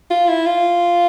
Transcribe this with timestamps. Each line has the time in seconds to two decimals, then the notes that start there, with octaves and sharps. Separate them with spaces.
0.10 F4
0.28 E4
0.46 F4